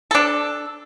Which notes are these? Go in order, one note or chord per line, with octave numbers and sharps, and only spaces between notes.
D4 A4